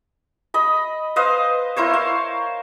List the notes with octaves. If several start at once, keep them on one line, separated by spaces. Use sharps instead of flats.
D#5 B5
B4 C5 D#5 F5
E4 A#4 C5 C#5
F5